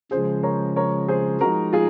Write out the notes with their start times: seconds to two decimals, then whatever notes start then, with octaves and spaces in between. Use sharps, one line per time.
0.11 C#3 F3 G#3 G#4 C5
0.43 A#4 C#5
0.76 A#4 C#5
1.08 G#4 C5
1.40 F3 G#3 D#4 F#4 A#4
1.73 F4 G#4